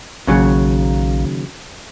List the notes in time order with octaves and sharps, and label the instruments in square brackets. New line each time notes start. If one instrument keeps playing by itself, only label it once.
[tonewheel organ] A#1 [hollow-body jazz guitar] D#2 C#3 F#3